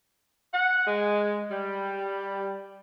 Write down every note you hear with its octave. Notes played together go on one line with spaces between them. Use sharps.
F#5
G#3
G3